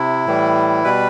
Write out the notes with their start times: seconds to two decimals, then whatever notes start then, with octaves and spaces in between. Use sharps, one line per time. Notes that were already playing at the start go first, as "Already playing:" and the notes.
Already playing: C3 E4
0.26 A2 E3 G3
0.84 B2 G3 B4